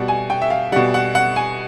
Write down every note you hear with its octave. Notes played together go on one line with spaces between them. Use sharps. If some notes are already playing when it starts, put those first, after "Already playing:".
Already playing: B2 G3 F#5
G#5
G5
E5
F5
B2 G3 F#5
F#5
F#5
G#5